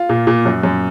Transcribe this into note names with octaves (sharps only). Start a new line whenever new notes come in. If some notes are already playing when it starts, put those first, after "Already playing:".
Already playing: F4
A#2
A#2
F#2
F#2